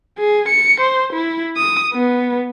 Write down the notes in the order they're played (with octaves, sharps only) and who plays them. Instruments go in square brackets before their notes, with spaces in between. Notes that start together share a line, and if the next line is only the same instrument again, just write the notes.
[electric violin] G#4
C#7
C5
E4
D#6
B3